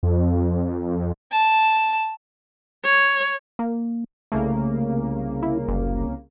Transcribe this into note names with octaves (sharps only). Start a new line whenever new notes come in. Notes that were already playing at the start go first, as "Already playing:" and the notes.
F2
A5
C#5
A#3
C2 C#3 A3 A#3
E4
F#1